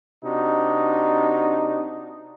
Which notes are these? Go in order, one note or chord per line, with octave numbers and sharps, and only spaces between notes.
C3 D4 D#4 F#4